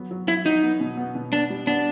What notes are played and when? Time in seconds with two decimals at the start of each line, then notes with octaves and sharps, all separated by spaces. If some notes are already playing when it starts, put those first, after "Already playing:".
Already playing: F#3 B3
0.11 F#3
0.27 F#3 E4
0.45 F#3 D#4
0.63 B3
0.80 B2
0.97 B3
1.15 B2
1.33 B3 D4
1.50 G3
1.67 B3 D4